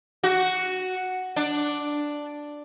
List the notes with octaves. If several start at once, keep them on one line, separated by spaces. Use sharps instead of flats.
F#4
D4